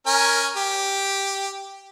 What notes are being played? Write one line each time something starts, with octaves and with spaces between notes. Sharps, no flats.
C#4 A#4 G#5
G4